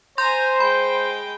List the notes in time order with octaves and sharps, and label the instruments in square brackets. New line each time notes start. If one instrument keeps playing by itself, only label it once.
[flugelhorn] C5 [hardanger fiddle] G#5 A#5 [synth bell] C6 G6
[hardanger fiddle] G#3 G5 [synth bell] B5